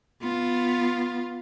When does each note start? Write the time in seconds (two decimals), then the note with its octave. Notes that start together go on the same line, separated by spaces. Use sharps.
0.21 B3 F4